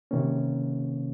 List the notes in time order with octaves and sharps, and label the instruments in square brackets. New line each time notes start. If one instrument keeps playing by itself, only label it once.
[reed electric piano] C3 D#3 A#3 C#4